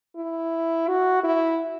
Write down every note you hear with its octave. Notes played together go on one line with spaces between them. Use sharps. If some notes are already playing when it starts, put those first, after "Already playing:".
E4
F#4
E4